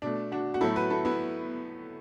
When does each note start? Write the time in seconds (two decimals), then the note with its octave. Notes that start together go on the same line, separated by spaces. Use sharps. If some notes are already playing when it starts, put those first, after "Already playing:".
0.02 B2 A3 D4
0.32 D4 F#4
0.54 F#4
0.61 A2 F#3 A3 E4 A4
0.76 F#4 B4
0.90 E4 A4
1.05 B3 E4